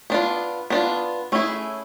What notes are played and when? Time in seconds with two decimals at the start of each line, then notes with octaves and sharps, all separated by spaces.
0.10 B3 D4 F4
0.70 B3 D4 F4
1.32 A3 C#4 E4 G#4